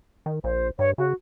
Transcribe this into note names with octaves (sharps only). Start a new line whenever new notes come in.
D#3
A#1 C5
G2 C#5
C#3 F#4